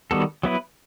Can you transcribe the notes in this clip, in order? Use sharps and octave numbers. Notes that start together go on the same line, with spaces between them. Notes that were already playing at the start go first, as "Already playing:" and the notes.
D#3 G3 B3 F#4 A4
F#3 B3 E4 B4